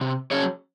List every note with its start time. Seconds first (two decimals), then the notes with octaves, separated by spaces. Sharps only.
0.01 C3
0.31 F#3 C#4 G#4 C#5